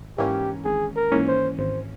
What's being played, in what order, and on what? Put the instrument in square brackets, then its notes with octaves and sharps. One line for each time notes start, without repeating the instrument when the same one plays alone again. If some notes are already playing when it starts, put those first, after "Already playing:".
Already playing: [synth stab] G#1
[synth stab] G#2 E3 A#3 C#4 [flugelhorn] G4
[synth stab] G#1 [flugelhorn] G#4
[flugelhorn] A#4
[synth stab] G#2 E3 A#3 C#4
[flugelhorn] C5
[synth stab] G#1 [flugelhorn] C5